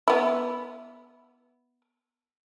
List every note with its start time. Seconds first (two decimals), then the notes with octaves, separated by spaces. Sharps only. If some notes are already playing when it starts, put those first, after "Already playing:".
0.08 B3 E4